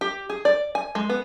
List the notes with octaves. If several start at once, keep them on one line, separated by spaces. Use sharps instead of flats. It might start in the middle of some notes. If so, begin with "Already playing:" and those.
G4
G#4
D5
G#5
G#3
B3